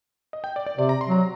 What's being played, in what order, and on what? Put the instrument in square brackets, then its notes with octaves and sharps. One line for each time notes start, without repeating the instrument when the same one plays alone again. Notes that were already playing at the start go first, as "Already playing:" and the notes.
[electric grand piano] D#5
G5
D5
D5
[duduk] C3 [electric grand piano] D5
[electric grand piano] A#5
C6
[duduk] F#3 [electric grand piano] A#5